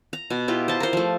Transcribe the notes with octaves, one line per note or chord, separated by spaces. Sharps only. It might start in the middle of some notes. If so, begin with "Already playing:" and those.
A#5
B2
E4 F4 G4
C5 A5
A#4 C5
F3 A3